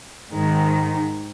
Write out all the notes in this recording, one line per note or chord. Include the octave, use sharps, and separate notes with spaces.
G#2 D#3 G#3